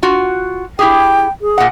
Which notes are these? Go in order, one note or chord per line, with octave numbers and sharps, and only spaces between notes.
F4 F#4
E4 G4 G#4 G5
G#4
A#2 F#5